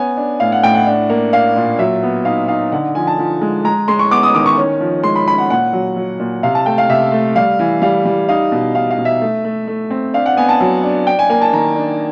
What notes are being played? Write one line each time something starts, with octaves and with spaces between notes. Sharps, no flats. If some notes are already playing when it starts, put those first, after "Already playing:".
Already playing: B3 C#4 G#5
D4
A2 F5
F#5
A2 G5
F#5
D4
A#3
D4 F5
A#2
F#3 E5
B3
D#4 F5
D#4 F5
D3 F#5
F3 G#5
A5
F3
G#3
G#3 A#5
G#3 C6
C#6
B3 D6
D#6
D#3 D6
C#6
C#4
F3
G#3 C6
B5
C#4 B5
F#5
A#2 F#5
F#3
F#3
A#2
C3 F5
A5
A3 G5
F5
C3 E5
A3
G3 F5
E3
G3 F5
G3
D#4 F5
B2
D#4 F5
F5
B2
E5
A3
A3
A3
C4
D4 F5
F#5
B3 G#5
A5
F#3
D4
D4 G5
G#5
A#3 G#5
A5
D#3 A#5
D4